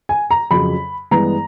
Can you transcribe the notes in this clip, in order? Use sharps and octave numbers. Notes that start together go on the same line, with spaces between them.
G#5
A#5
F2 C#3 F#3 B5
G2 E3 G#3 B3 A#5